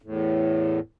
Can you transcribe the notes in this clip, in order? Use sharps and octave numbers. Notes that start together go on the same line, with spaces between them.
E2 A2